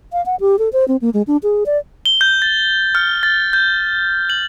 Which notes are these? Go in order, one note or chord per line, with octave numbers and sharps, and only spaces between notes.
F5
F#5
G4
A4
C5
C4
A#3
G#3
D4
G#4
D5
G7
G6
A6
F6
A6
G6
F#7